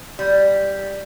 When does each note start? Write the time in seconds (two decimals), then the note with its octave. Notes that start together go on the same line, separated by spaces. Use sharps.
0.19 G3